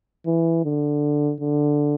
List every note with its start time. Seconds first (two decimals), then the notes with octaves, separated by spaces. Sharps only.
0.26 E3
0.64 D3
1.40 D3